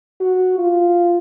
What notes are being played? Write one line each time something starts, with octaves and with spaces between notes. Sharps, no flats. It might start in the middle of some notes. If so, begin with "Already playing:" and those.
F#4
F4